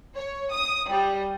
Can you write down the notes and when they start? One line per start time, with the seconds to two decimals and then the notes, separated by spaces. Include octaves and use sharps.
0.16 C#5
0.52 D#6
0.90 G3